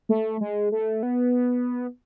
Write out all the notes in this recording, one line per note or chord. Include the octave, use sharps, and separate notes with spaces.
A3
G#3
A3
B3